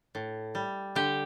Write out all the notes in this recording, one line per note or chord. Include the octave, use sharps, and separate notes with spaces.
A2
G3
D3 G4